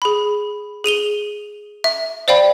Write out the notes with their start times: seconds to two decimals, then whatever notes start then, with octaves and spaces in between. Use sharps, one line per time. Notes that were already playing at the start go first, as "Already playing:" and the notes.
0.02 G#4 B5
0.84 G#4 D#7 F7 G7
1.84 E5
2.28 C5 D5 F5 G5 B5